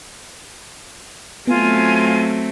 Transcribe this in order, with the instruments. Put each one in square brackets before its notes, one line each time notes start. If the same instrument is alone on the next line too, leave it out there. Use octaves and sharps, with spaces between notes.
[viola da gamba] F#3 A3 C4 [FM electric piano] B3 [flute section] F4 G#5